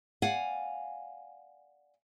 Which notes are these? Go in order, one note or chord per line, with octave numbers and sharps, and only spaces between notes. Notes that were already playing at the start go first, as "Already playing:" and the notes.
D5 F5 F#5 G#5